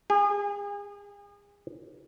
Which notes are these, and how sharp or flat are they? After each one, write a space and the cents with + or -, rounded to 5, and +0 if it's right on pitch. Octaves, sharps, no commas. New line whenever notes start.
G#4 -35